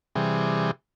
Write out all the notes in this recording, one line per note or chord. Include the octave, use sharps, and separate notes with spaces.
C3 E3 G3 G#4